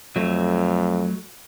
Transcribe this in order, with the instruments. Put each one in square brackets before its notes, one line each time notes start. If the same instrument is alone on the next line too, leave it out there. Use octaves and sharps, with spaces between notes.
[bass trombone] F2 [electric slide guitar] F#3 A3